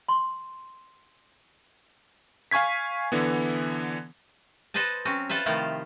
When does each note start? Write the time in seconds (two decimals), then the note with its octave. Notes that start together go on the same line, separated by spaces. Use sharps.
0.09 C6
2.51 F5 G#5 C#6 G#6 B6
3.12 D3 E3 B3
4.74 A4 B4 C5 D#5 A5
5.05 F#3 C4 C#4
5.29 F4 A4 B4 C5 E5
5.46 C3 D#3 F3 A3 E4 F4